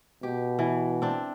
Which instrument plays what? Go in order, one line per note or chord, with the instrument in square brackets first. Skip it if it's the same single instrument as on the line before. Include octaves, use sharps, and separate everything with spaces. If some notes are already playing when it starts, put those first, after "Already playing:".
[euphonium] B2 [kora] G4
[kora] E3
C4 D4